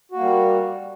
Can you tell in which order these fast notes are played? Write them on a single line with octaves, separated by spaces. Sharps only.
F#4 A#3 G3